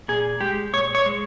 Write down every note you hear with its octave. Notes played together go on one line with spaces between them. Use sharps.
A#2 G#4
G#3 G4
A#2 C#5
C#5
G#3